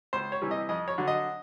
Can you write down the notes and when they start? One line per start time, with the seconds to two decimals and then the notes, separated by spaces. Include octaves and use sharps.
0.13 C#2 C5
0.32 C#5
0.42 C3 E3 G3
0.51 D#5
0.69 F2 D#5
0.88 C#5
0.98 D3 F#3
1.08 D#5